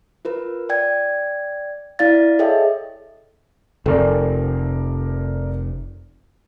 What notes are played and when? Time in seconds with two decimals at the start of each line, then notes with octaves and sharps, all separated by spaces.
0.25 F4 A#4 B4
0.69 D5 G5 G#6
1.99 E4 D5 F5 A6
2.39 G#4 A4 C#5 D#5 E5 G5
3.86 F1 A4 A#4 D5